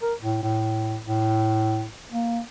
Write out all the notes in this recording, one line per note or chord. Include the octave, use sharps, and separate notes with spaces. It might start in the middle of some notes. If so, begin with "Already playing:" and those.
A#4
A2
A2
A2
A#3